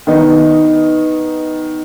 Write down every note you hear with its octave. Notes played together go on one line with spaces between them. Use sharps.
D#3 B3 D#4